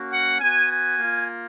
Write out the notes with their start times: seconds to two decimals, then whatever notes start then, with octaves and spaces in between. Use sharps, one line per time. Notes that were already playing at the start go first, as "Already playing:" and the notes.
Already playing: A#3 C#4 F#4
0.12 F#5
0.40 B3 F#4 G#5
0.70 G#5
0.99 A#3 F4